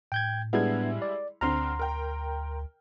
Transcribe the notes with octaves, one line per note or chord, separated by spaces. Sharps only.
A2 G5 G6 G#6
G3 G#3 B3 D4 E4 G#6
D5
D2 D3 C4 A#5 C6 F6
A#4 G5